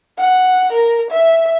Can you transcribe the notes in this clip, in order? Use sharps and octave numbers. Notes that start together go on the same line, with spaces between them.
F#5
A#4
E5